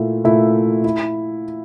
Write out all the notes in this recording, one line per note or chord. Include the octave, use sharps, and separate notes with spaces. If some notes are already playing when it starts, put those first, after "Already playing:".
Already playing: A#2 A3 E4
A#2 A3 E4
E4